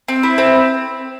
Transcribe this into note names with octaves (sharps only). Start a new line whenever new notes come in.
C4
E4
C4